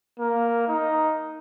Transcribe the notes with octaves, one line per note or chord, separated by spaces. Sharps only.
A#3
D#4